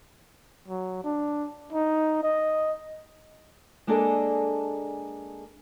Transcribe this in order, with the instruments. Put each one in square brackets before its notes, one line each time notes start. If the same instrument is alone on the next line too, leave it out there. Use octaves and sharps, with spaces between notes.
[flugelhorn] F#3
D4
D#4
D#5
[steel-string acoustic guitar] G#3 A#3 D4 G#4 A4 D#5